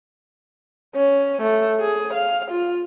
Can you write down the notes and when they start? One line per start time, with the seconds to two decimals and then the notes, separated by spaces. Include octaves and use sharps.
0.95 C#4
1.42 A3
1.81 G#4
2.14 F5
2.51 F4